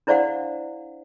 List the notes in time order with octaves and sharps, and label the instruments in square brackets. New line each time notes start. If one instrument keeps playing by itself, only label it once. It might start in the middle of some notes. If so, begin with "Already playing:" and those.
[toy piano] D4 E4 C5 D5 F5 F#5